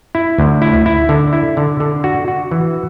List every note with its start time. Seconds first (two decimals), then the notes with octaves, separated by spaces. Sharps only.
0.15 E4
0.38 D2
0.62 E4
0.86 E4
1.09 D3
1.33 E4
1.57 D3
1.80 D3
2.04 F#4
2.28 F#4
2.51 E3